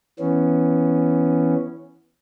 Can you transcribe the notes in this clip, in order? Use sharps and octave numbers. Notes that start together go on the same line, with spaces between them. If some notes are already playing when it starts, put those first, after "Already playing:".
E3 B3 C#4